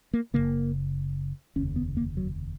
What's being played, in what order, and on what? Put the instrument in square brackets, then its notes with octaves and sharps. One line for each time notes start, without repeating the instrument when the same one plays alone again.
[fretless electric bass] A#3
F#1 F#2 C#3 A#3
F1 D#2 C#3 C#4
B3
A#3
F#3